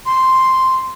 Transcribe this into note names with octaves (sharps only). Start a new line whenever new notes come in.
C6